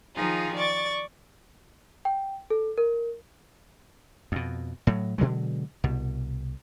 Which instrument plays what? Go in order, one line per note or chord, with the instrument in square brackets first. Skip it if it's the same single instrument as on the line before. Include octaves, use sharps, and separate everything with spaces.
[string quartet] D#3 F3 D#4 F4 G#4
D5 C#6 A6
[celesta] G5
A4
A#4
[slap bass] F2 B2
A2 F#3
B2 D3 F#3 G#3
C2 B2